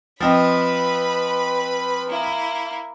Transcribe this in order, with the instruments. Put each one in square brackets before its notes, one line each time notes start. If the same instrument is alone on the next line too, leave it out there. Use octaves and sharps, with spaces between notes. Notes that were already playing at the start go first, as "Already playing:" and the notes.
[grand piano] F3 C4 D#5 [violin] B4 B5
[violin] A#3 E4